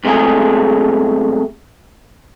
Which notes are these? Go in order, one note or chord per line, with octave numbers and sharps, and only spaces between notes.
B1 C3 G#3 A3 G#4